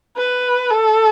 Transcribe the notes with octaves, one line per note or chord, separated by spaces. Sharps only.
B4
A4